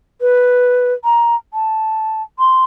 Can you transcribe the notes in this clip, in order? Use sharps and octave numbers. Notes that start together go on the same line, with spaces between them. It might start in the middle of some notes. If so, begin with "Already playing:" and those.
B4
A#5
A5
C6